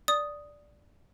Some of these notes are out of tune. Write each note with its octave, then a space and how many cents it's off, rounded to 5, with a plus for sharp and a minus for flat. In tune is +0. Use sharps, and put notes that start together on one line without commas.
D5 +0 D#6 +0